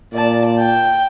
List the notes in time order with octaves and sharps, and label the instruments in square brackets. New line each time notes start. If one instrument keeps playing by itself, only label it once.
[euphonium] A#2 [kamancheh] D5 A5
[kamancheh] G5